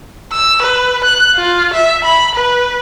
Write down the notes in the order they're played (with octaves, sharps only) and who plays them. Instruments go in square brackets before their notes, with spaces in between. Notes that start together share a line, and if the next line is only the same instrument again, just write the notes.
[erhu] E6
B4
F#6
F4
E5
B5
B4